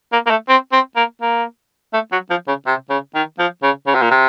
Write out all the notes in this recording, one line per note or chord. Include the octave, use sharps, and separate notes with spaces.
A#3
A#3
A3
C4
C4
A#3
A#3
A3
F#3
F3
C#3
C3
C#3
D#3
F3
C#3
C#3
C3
A#2
C3